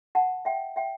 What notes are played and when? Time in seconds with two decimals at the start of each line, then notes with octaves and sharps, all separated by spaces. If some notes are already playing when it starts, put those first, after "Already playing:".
0.15 F#5 A5
0.45 E5 G5
0.76 E5 G5